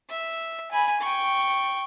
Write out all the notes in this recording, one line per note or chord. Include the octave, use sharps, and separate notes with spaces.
E5
G#5 B5
G5 C#6